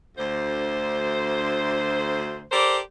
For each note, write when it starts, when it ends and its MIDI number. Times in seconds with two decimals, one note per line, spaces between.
0.17 2.45 38
0.17 2.45 72
2.51 2.78 67
2.51 2.78 69
2.51 2.78 70
2.51 2.78 72
2.51 2.78 74